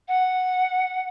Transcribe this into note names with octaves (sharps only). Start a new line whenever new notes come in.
F#5